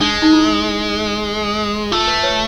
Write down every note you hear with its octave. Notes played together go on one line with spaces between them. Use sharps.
G#3 D4
D#4
E4
A3 F4
B4
B4 C#5